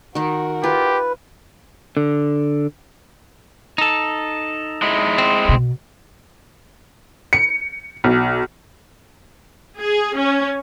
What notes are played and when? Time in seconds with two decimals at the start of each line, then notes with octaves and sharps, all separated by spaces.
0.15 D#3 D#4 F#4 A#4
0.64 F4 G4 B4
1.97 D3
3.78 D#4 A4
4.82 G#3 E4
5.18 C4
5.49 B2
7.33 C#7
8.04 B1
9.78 G#4
10.17 C#4